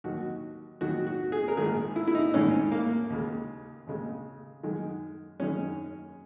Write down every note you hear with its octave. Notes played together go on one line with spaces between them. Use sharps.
D#2 D#3 F#3 F#4
D#2 D#3 F#3 F#4
F#4
G#4
A#4
A#1 G#2 D#3 G#4
E4
E4
D#4
A#1 G#2 D#3 C#4
A#3
D#2 C#3 G#3
D#2 C#3 G#3
F#2 D#3 G#3
F#2 D#3 G#3 C#4